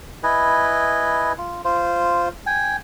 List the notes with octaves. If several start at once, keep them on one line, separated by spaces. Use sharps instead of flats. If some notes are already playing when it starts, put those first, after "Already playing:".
E4 B4 D#5 G#5
F4
F4 C5
G5 G#5